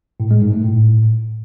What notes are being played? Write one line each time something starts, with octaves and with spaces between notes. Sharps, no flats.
A2
G#3
G#2
A3
A2